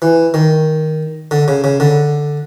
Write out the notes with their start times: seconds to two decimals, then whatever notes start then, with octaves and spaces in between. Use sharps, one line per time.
0.02 E3
0.34 D#3
1.31 D3
1.48 C#3
1.64 C#3
1.80 D3